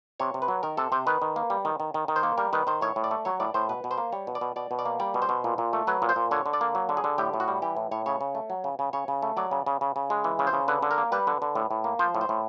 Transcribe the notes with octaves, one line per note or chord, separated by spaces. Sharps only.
C3 C#5
C3
B4
F#3
D#3 A#4
C3 A4
C3 C5
D#3 B4
D#3
A#3
G3
D#3
D#3
D#3
D#3
C5
A#3
G3 A#4
D#3 B4
D#3 C5
A2 C#5
A2
D5
A3
F#3 C#5
A2 D5
A2 C5
B2 B4
B2
C5
A#3
G3 C#5
B2
D5
B2
B2 D5
B2
D5
A#3
G3 D5
B2
C5
B2
A#2
A#2
A3
F#3 B4
A#2
C5
A#2
D3 C#5
D3
D5
A#3
F#3
D3
G#4
D3
A2 G4
A2
F#4
G3
E3 G4
A2
A2 C#5
C#3 C#5
C#3
A3
F#3
C#3
C#3
C#3 C#5
C#3
A3
F#3 D5
C#3
C#3
C#3
C#3
G#3
E3
C#3
C5
C#3
D3 B4
D3
A#4
A#3
G3 B4
D3
D3
A2
A2
A#3
F3 C5
A2
C5
A2